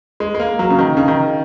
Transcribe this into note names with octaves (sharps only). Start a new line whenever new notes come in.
G#3
G#3
A#3
F#3
C#3
D#3
C#3
D#3